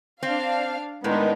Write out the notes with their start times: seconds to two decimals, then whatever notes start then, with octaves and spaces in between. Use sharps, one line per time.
0.23 C4 D4 F5
1.04 A2 D#3 G#3 B3 D4 D#4